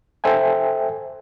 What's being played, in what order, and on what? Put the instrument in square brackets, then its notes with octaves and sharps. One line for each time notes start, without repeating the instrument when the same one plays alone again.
[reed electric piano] A4 C5 E5 G5 G#5